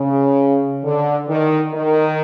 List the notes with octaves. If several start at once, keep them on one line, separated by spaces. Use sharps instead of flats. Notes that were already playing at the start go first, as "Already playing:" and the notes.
Already playing: C#3
D3
D#3
D#3